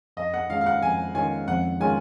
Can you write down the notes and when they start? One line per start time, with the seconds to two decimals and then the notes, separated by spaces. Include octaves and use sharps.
0.17 F2 D#5
0.34 F#5
0.50 D#3 G#3 C#4 F4 F5
0.61 F5
0.66 F#5
0.82 F2 G#5
1.15 D#3 G#3 C#4 F4 G#5
1.48 F2 F#5
1.81 D#3 G#3 C#4 F4 G#5